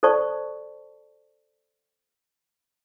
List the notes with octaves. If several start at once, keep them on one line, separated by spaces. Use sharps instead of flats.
A4 C5 D5 A5 C#6